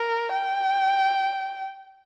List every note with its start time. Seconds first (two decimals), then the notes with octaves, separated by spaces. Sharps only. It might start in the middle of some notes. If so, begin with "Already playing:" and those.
Already playing: A#4
0.33 G5